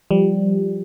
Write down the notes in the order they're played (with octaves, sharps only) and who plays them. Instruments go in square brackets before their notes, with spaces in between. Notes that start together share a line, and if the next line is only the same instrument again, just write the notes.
[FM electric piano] F3 G3